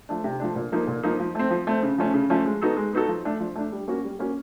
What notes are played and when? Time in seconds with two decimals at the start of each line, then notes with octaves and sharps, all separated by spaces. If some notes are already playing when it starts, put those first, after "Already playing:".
0.09 F3 A3 D4
0.24 C3
0.40 F3 A3 D4
0.56 A#2
0.72 F3 A#3 D#4
0.87 A#2
1.03 F3 A#3 D#4
1.20 F3
1.35 A3 C4
1.51 F3
1.67 A3 C4
1.83 C#3
1.98 F3 A3 C#4
2.14 C#3
2.30 F3 A3 C#4
2.46 G#3
2.61 B3 D#4 F#4 A4
2.77 G#3
2.93 B3 D#4 F#4 A4
3.08 F3
3.25 A3 D4
3.40 F3
3.56 A3 D4
3.72 G3
3.88 A#3 C#4 F#4
4.04 G3
4.19 A#3 C#4 F#4